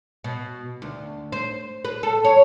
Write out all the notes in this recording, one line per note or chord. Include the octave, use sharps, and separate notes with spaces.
B2
D2
C5
B4
A4
C#5